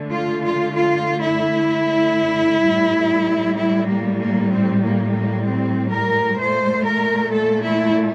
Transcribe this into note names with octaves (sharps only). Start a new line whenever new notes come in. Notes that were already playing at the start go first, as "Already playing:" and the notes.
Already playing: D3 A3
F4
F4
F4
E4
A2 G3
E4
A#3
A#3
C4
A#3
A#3
C4
A#4
A#2 A3 C5
A#4
A4
E4